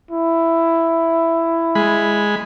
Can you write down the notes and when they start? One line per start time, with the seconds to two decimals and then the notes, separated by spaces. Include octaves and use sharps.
0.11 E4
1.75 G#3 B5